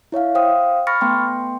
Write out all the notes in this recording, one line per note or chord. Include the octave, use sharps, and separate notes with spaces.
E4 C#5 E5 F5
C5 F5 G5 D#6
B5 C#6 F6 A6 A#6 C#7
A3 B3 G5 C6